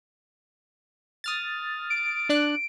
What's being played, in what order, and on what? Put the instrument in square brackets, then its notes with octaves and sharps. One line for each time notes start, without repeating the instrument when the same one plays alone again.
[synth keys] D#6 F6 A6
[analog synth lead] D7
[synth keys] D4 D5 F#6